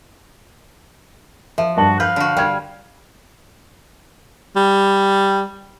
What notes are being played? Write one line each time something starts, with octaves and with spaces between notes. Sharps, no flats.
F3 E5
G2 F#4 A5 F#7
B4 F5 G6
D3 F#4
G3 G5 G#6
G3